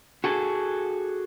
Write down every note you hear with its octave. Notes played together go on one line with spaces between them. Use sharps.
F#4 G#4 A4